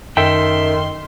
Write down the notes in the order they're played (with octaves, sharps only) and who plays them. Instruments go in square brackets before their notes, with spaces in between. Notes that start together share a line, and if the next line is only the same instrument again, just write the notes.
[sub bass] F#2 [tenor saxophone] D#3 [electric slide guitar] A4 E5 G5 [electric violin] C6